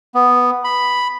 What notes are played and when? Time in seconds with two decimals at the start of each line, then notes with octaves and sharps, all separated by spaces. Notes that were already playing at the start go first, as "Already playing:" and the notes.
0.15 B3
0.64 B5